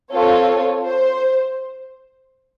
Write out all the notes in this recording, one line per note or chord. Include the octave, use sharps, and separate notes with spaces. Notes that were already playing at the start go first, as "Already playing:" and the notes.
C4 F4 A4 C#5
C5